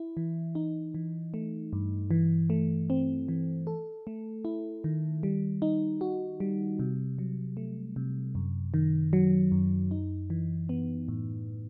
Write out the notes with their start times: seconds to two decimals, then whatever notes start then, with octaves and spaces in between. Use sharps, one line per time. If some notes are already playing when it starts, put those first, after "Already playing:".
Already playing: E4
0.17 E3
0.55 D#4
0.95 E3
1.34 A3
1.73 G2
2.11 E3
2.50 A3
2.90 C4
3.28 E3
3.67 A4
4.07 A3
4.45 E4
4.84 D#3
5.23 G3
5.62 D#4
6.01 F#4
6.40 G3
6.79 C3
7.19 F#3
7.57 A3
7.96 C3
8.35 F#2
8.74 D#3
9.13 F#3
9.52 F#2
9.91 D#4
10.30 E3
10.69 B3
11.08 A2